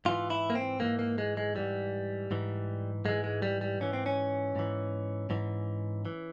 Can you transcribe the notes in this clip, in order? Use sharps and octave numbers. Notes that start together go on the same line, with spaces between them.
G#2 E3 F4
E4
A#3
C4
G#2 E3 A#3
A#3
G#3
G#3
G#2 E3 G3
G#2 E3
G#2 E3 G#3
G#3
G3
G3
G#2 E3 C#4
C4
C#4
G#2 E3
G#2 E3
E3